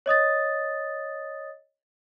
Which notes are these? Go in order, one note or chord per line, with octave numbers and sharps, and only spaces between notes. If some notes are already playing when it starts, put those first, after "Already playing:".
C#5 D#5 D#6 A6